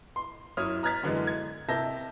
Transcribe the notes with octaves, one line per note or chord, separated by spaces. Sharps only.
C6
F#2 E4 C#5 D#6 F6
A#5 F6 F#6 G#6 A6 B6
F#2 D3 E3 G#3 B3
G#6
C3 A#4 E5 A5 G6 A#6